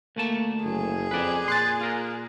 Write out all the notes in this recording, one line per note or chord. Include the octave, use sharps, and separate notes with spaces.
D2 A3 A#3 A5
F#1 G#4
F2 B4 D5
A#2 C6 F#6 A6
F4 A#4